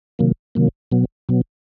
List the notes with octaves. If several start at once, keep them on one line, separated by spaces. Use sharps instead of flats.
C3 D#3 F#3 A#3
C3 D#3 F#3 A#3
B2 F#3 B3
B2 F#3 B3